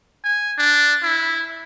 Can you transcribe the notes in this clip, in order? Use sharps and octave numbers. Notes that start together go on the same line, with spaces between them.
G#5
D4
E4